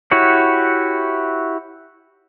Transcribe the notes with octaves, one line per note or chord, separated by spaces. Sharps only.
E4 F#4 G4 C#5 F#5